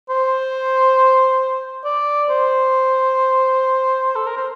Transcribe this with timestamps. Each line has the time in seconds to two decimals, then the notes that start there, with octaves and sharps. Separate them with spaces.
0.09 C5
1.84 D5
2.29 C5
4.15 A4
4.26 A#4
4.36 C5